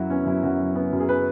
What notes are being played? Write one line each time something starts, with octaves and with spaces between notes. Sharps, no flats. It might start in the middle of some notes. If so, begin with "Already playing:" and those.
Already playing: F#2 F#3 E4 F#4
B3 C#4
F#2 E4
F#2 F#4
F#3
B3
F#2
G#4
B4